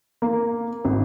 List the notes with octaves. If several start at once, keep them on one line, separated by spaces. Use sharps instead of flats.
A#3
G#1